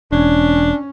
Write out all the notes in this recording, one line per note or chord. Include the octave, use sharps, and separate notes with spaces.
E1 C#4 D4